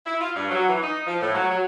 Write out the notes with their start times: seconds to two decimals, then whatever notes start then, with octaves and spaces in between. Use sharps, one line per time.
0.06 E4
0.21 F4
0.34 G2
0.49 F#3
0.68 E3
0.82 D#4
1.06 F3
1.21 A2
1.34 F#3
1.50 F#3